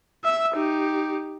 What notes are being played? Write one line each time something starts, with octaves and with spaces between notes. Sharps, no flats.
E5 E6
D#4 G4